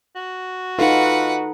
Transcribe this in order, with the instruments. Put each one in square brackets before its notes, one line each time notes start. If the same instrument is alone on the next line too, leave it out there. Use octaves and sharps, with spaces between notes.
[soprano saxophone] F#4
[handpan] D#4 A4 [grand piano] F4 [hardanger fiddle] B4 F#5